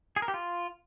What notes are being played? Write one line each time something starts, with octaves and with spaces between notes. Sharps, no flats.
G#4
A#4
G4
F4